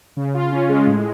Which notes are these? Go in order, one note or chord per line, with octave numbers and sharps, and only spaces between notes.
C#3
F4
C#4
G#3
A2